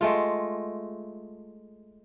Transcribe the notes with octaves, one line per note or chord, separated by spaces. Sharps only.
G#3 A3 F4